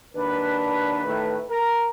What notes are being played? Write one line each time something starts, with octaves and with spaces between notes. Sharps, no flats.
D#2 D4 B4
A2 D#3 A3
A#4